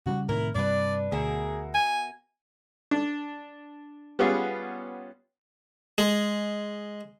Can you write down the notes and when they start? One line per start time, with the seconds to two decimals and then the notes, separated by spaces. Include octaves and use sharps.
0.06 C#3 F#3 G3 F#4
0.29 A2 C3 D#3 E4 A#4
0.55 G2 C3 G3 D4 B4 D5
1.12 D2 B2 G#4 A#4 E5
1.75 G#5
2.91 D4
4.19 G3 B3 C#4 F4 G#4
5.98 G#3